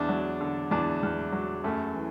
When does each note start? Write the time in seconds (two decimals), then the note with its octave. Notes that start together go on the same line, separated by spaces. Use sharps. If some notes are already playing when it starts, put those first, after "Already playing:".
Already playing: E2 D4
0.09 F#3
0.41 D3
0.71 E2 D4
1.03 E2
1.33 F#3
1.64 F#2 A3
1.95 E3